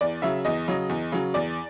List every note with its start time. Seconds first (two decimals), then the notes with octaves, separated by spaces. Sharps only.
0.01 E2 D5
0.22 C#3 F#3 E5
0.45 E2 D#5
0.68 C#3 F#3
0.89 E2
1.12 C#3 F#3
1.34 E2 D5